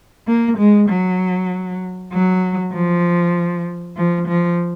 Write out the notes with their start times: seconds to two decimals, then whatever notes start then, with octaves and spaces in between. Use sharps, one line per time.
0.27 A#3
0.58 G#3
0.89 F#3
2.13 F#3
2.73 F3
3.97 F3
4.28 F3